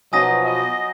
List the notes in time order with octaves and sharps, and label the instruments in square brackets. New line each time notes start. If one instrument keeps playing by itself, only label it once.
[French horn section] B2 F3 [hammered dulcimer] F#3 D#4 [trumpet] D#5 [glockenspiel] G#5 D#6 A#6
[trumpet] D#5